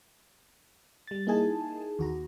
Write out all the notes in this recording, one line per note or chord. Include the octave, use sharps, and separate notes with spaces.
G3 A6
A#3 D#4 E4 G#4 G#5 A5
D#2 F#4 A#5